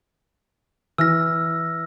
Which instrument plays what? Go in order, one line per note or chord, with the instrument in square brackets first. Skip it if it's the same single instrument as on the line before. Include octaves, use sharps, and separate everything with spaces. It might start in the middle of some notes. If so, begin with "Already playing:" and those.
[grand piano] E3 [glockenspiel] E6 F6 A#6